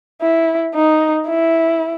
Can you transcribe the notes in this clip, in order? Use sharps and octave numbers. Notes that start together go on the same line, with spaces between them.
E4
D#4
E4